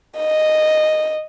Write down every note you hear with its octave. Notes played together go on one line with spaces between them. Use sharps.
D#5